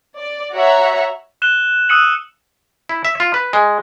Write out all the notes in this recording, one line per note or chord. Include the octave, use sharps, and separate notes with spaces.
D5
F#4 C#5 E5 F#5 A#5
F#6 E7 G7
D#6 E6 F#6 C#7 D#7 F#7
E4
E5
F4
B4
G#3